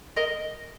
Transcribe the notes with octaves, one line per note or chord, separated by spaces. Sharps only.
A#4 D#5